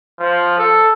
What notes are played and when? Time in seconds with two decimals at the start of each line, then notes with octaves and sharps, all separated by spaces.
0.19 F3
0.58 A4